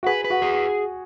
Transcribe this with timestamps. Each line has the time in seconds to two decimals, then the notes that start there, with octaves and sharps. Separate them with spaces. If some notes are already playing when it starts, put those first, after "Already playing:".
0.03 F#4
0.07 G#4 B4
0.24 B4
0.30 F#4
0.42 G#4